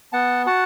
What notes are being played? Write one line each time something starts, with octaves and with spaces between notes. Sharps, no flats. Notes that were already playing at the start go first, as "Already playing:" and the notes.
B3 F#5 A5
F#4 F#5 A5